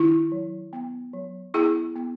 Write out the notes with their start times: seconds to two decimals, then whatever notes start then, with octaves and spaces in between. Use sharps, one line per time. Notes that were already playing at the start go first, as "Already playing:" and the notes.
Already playing: D#3 E4
0.32 F#3
0.73 B3
1.13 F#3
1.54 B3 E4 G#4
1.96 B3